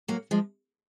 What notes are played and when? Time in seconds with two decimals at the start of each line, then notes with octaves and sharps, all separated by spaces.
0.08 F#3 A#3
0.31 F3 G#3